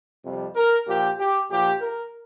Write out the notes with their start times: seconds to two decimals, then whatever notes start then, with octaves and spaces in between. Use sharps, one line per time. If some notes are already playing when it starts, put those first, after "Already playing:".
0.25 F2 C3 F3 G3
0.56 A#4
0.87 A#2 F3 G4
1.19 G4
1.50 A#2 F3 G4
1.81 A#4